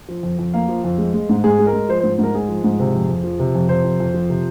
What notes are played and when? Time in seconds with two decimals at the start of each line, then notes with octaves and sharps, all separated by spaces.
0.08 F3
0.23 F2
0.39 F2
0.54 A#3 F5
0.69 F3
0.84 F2
0.98 G#3
1.14 G#3
1.29 G#2
1.44 G#2 G#4
1.59 G#3
1.67 A#4
1.73 G#3
1.89 F3 C5
2.00 G#2 C5
2.19 G#2 A#4
2.34 G#3 G#4
2.49 F3
2.64 G#2
2.80 C3
2.95 F2
3.09 F2
3.24 F3
3.40 C3
3.55 F2
3.69 C3 C5
3.84 F2
4.00 F2
4.14 F3
4.30 C3